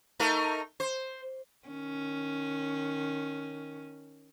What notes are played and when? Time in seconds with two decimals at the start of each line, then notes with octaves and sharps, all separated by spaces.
0.20 A3 D#4 A#4
0.80 C5
1.68 D#3 C#4